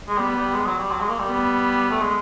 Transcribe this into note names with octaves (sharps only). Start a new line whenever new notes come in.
G#3
G3 B3
G3
G#3
F#3
G3
F#3
G#3
A#3
G3
B3
A3
G#3